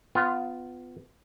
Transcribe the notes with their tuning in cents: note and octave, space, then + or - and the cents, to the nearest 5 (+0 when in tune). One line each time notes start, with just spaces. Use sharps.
B3 +25 F4 +0